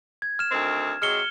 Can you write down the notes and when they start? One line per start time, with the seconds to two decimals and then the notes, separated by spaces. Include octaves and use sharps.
0.22 G#6
0.39 F6 E7
0.51 D2 D#3 C4
1.02 C3 F#3 G#3 F6 C#7 G7